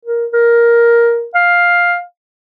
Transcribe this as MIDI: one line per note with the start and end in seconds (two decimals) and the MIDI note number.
0.05 0.26 70
0.33 1.26 70
1.35 1.99 77